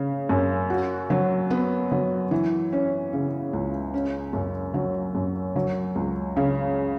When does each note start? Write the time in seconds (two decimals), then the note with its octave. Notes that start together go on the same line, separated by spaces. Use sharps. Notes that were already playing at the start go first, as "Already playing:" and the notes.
Already playing: C#3
0.29 F#2
0.70 F#4
1.10 F#3
1.50 B3
1.92 F#3
2.31 E3
2.73 C#4
3.13 C#3
3.53 C#2
3.94 C#4
4.33 F#2
4.74 F#3
5.15 F#2
5.56 F#3
5.96 C#2
6.36 C#3